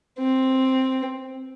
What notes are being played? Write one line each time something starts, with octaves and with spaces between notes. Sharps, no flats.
C4